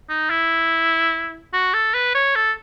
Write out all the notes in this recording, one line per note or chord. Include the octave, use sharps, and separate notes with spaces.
D#4
E4
F#4
A4
B4
C#5
A4